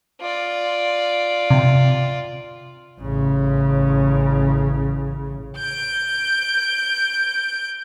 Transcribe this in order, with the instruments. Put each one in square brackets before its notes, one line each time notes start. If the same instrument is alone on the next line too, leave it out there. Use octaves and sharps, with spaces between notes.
[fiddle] F4 D5
[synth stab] C3
[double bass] A1 C#3
[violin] G6 D7